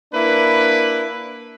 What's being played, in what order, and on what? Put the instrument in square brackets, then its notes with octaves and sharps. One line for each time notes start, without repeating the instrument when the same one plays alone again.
[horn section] A#3 D4 E4 B4